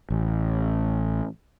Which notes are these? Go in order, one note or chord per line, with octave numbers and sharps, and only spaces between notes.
A1